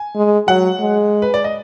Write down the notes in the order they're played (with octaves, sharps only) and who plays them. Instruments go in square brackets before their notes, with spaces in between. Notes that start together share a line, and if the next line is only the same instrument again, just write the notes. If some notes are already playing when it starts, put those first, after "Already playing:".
Already playing: [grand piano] G#5
[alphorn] G#3
[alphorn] F#3 [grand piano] F#5
[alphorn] G#3
[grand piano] B4
D5
D#5